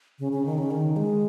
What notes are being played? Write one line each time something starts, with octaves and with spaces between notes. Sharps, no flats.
C#3
C#3
D#3
C#3
D#3
G#3